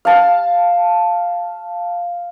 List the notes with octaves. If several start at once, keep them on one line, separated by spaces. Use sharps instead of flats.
F5 A5